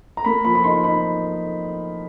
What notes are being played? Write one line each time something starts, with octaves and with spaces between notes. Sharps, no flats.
A#5
A#3 B5
F3 B5
B5
D#4 C6
D#4 B5